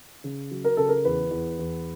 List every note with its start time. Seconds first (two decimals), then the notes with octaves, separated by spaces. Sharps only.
0.24 C#3
0.51 F#3
0.64 A#4
0.77 C#3 A4
0.89 A#4
1.05 E2 B4
1.31 E2
1.59 E2